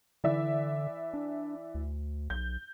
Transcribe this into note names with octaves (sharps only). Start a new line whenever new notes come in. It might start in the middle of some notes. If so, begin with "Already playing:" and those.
D3 E3 D5 E5
D4
D2
B1 G6